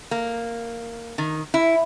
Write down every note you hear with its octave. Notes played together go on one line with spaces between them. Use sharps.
A#3
D#3
E4